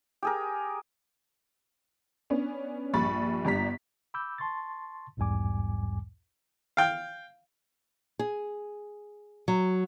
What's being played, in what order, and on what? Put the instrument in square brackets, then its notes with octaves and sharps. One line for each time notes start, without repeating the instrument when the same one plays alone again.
[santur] G4 G#4 A#4
[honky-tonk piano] B3 C#4 D4
A#1 G2 B5 C#6 A6
G1 G2 A#5 B6
[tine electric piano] B5 D6 E6 G6
A5 C6 C#6 A6
B1 E2 G#2 G3 G#5 D6
[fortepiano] F5 G5
[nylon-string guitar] G#4
F#3